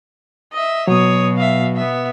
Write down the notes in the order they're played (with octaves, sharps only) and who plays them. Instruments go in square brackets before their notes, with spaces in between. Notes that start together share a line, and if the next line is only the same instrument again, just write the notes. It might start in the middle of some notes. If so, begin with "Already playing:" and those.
[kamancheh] D#5 E5
[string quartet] B2 [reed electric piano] F#3 [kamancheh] C#5 D#6
[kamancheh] E5 F5
B3 E5